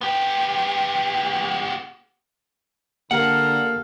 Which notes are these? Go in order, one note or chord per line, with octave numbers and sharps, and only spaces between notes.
B3 G4
D3 A#3 G4 A4 A#4 F5 F#5 A#5